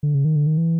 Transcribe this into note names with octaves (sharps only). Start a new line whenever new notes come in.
D3
C#3
D#3
D3
D#3
E3